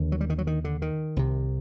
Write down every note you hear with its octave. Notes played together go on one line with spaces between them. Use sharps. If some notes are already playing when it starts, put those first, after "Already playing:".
Already playing: D#2 D3
F#3
G3
D#3
F#3
D#3
D3
D#3
C2 C3